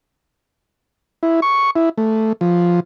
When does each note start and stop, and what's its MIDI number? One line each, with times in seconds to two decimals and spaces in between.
1.23 1.40 64
1.42 1.71 85
1.76 1.89 64
1.98 2.33 57
2.41 2.80 53